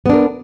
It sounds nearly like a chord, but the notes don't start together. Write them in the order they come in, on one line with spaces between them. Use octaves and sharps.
B3 D4 A#4